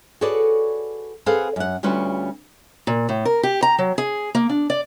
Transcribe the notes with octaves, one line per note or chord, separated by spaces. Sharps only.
F#4 G#4 A4 B4 C#5 D5
C4 G#4 A4 B4 F5 F#5
F#2 F#5
D2 G3 C#4 F4 F#4 B4
A#2
A2
A#4
G4
A#5
F#3
G#4
A#3
D4
D5